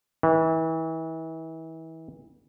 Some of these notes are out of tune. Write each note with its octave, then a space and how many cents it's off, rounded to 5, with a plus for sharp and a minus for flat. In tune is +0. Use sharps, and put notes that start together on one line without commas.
E3 -30